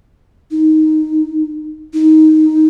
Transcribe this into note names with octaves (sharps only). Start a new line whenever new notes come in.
D#4
D#4